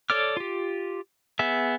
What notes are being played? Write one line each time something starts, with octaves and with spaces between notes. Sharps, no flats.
A4 C#5 D5 D6 F6
F4 G4
B3 G#4 E5